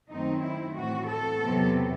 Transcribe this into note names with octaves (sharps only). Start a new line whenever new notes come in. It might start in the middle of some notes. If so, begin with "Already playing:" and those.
F#2 D#3 A3 C4 D#4
E4
A2 E3 A3 C4 F#4
A4
E2 C3 F#3 B3